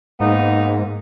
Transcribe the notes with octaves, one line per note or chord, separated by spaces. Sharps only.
G#2 A#3 B3 D#4